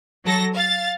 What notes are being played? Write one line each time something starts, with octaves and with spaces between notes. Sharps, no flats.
F#3 A4 A#6
F5 A6